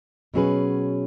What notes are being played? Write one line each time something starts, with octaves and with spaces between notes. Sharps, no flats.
B2 F#3 C#4 G#4 B4